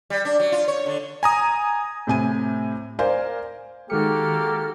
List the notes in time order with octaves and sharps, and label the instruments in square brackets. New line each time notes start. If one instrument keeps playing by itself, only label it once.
[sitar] G3
D4
F#3
F4
C#5
D3
[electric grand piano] G#5 A#5 D#6
[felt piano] A2 C3 G#5 D#7
A#4 C5 D5 F5 G#5
[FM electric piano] D#3 G#3 C#7 [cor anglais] A#3 [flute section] F#4 A4 F6 [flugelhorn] G4